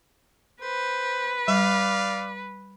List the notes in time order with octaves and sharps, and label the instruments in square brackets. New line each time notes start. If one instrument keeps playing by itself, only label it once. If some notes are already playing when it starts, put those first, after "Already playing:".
[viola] B4 [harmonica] C5
[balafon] G3 [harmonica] D5 F5